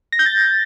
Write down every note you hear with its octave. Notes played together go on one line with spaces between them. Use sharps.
A#6
G6
A6